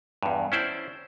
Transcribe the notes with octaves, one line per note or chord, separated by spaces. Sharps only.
E2 G2
C#4 E4 C5 D5